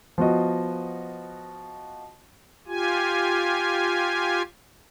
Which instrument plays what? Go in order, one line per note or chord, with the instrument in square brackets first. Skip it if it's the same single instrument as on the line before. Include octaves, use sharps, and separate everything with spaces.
[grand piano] F3 B3 F#4 D#5
[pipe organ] F4 G4 G#5